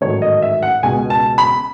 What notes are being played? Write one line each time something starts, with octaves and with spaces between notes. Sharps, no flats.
A1 G#2 D#3 F#3 A3 C#5
D#5
E5
F#5
C#2 B2 G#3 G#5
A5
B5